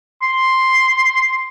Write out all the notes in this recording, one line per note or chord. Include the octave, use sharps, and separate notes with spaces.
C6